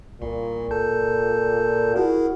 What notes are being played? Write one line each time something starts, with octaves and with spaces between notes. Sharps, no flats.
C2 A#2
A4 A5 G6
E4 F#4 G#4 A#4